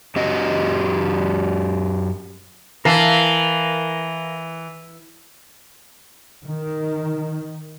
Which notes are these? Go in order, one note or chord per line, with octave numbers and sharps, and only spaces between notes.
F#2 C#4 F#4 G4 D#5
E3 A#4 F5 A5
D#3